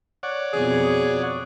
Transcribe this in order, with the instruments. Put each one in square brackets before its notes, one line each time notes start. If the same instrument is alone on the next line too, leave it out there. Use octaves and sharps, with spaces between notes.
[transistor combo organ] C#5 D5 F#5
[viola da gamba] F2 B2 [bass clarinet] G#4
[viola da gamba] F2